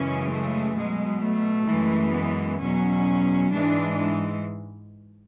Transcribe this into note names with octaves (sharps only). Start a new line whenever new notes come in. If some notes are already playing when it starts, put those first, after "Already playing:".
Already playing: F#2 C#3 E3 G#3 C#4
A3
B2 F#3 G#3
A3
F#2 E3 G#3
B3
E2 B2 F#3 C#4
G#2 E3 G#3 D4